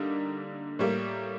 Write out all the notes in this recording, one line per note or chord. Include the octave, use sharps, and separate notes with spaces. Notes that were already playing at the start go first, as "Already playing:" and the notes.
Already playing: D3 G3 A#3 D#4
A2 G3 A#3